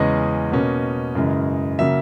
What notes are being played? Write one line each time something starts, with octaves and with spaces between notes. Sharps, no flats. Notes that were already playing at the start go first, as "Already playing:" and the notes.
Already playing: E2 C#3 G#3 C#4 D#5
B2 A#3 C#4
F#2 C#3 E3 G#3
C#3 F#3 A#3 E5